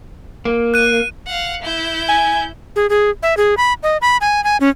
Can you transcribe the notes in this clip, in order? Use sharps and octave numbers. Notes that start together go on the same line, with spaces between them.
A#3
F#6 D#7
F5 F#5
E4 G6
G#5
G#4
G#4
E5
G#4
B5
D#5
B5
G#5
G#5
C#4